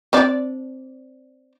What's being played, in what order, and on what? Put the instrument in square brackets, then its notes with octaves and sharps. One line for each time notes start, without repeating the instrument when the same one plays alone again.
[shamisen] C4 D4 D5